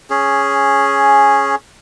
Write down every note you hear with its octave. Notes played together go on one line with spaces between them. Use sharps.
C#4 G#4